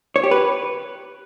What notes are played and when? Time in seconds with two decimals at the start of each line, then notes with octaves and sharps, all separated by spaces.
0.16 C#5
0.24 G4
0.31 B4